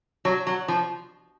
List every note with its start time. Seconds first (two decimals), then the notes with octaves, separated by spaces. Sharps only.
0.25 F#3
0.47 F#3
0.68 F3